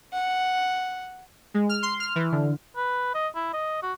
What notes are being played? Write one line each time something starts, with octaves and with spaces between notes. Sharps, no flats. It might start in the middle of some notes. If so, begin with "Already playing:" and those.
F#5
G#3
F6
C6
F6
E3
D3
B4
D#5
E4
D#5
F#4